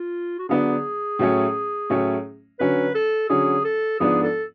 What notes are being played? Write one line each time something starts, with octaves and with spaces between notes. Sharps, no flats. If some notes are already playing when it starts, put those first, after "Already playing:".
Already playing: F4
F#4
D3 F#3 B3 D4 G#4
A2 F#3 A3 C#4
A2 F#3 A3 C#4
D3 F#3 C#4 B4
A4
D3 F#3 C#4 G#4
A4
G#2 F3 B3 D4 G#4
A4